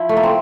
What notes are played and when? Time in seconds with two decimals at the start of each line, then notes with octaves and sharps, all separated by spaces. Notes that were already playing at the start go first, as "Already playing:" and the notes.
Already playing: F3 E4
0.09 A3
0.17 A#3
0.23 C4